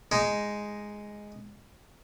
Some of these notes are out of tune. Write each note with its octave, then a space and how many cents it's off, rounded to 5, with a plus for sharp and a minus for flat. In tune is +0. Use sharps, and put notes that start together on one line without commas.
G#3 +0 D#4 +0